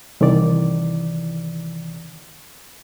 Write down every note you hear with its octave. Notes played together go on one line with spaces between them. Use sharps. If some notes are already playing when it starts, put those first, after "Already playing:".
C2 D#3 E3 D5